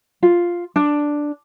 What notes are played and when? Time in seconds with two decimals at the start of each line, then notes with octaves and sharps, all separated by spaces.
0.23 F4
0.76 D4